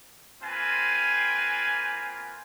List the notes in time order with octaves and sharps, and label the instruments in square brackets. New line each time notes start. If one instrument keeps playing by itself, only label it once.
[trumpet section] A#3 C4 F4 B4 G5 G#5